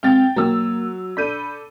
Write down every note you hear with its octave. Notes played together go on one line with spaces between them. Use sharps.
G#3 C4 F5 G5 A6
F#3 A#3 E6
D4 A4 B5 G6 D#7